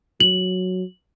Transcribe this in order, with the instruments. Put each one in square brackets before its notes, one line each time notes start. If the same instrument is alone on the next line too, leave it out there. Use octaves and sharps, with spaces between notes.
[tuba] F#3 [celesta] F#7